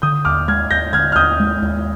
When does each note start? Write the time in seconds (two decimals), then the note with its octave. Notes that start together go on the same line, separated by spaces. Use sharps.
0.02 D3 D#6 G6
0.25 D#2 D6 F6
0.48 G#3 F6 G#6
0.70 D#2 G6 A#6
0.93 D3 F6 G#6
1.12 F6
1.16 D#2 D#6 G6
1.40 G#3
1.62 D#2